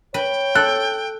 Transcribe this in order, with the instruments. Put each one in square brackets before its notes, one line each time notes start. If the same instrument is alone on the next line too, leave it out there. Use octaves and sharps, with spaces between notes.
[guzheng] B4 [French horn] C#5 [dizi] G5
[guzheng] A4 [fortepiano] F#6